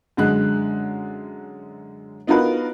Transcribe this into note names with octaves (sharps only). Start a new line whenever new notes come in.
F#2 D3 G#3 F#6
B3 D#4 F4 F#4 A#4 B4